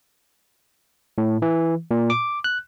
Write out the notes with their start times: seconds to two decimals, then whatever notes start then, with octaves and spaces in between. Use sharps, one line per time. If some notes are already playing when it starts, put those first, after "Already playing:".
1.18 A2
1.42 E3
1.91 A#2
2.10 D6
2.44 F#6